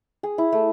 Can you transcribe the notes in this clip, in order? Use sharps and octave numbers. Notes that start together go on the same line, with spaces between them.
G#4
E4
A3